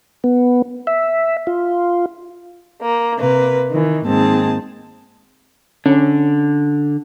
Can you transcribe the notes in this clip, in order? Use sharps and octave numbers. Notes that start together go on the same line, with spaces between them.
B3
E5
F4
A#3
C3 A#3 B4
D#3 E3
D#2 G#2 C4 G#4 A5
D3 C#4